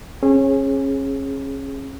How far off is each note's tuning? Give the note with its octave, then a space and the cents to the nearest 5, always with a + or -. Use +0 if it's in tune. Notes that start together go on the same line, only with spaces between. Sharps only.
C#4 -30 G#4 +0